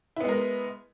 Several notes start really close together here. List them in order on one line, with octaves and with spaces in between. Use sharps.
E4 B3 G#3 A#4